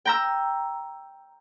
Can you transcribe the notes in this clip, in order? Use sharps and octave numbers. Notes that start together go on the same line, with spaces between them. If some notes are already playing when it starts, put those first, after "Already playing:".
G5 A#5 E6